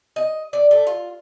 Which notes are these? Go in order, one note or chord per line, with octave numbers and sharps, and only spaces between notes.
D#5
D5
A3
F4